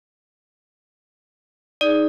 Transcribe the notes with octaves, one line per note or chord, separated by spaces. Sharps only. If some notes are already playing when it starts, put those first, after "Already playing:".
D#4 G#4 D5